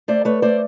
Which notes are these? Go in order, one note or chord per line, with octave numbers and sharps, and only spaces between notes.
A3 C5 D5
A3 B4 C#5
A3 C5 D5